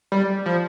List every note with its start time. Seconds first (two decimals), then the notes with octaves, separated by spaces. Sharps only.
0.12 G3
0.46 F3